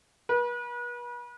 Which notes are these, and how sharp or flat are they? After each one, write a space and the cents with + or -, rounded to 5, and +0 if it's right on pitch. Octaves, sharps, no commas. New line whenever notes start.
B4 -40